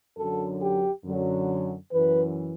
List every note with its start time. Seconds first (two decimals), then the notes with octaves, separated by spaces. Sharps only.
0.17 F#2 D3 F#3 A4
0.61 G4
1.05 F#2 D3 F#3
1.92 F#2 E3 B4